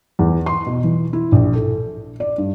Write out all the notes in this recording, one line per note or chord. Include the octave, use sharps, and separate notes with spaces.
E2
C6
B2
E3
E4
A#1
A4
D5
G2